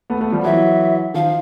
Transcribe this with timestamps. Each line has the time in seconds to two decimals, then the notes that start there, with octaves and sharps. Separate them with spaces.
0.10 A3 B3
0.21 A3 B3
0.32 F3 G3
0.44 E3 F#3 E5
1.14 D#3 F3 F5